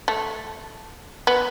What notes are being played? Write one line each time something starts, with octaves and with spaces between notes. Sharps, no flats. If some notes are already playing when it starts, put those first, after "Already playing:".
A3
B3